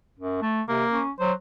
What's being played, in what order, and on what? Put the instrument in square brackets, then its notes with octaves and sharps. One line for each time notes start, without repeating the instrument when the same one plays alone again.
[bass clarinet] F#2
A3
[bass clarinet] C3 [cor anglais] A#3
[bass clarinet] C#4
[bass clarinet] F#3 [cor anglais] C5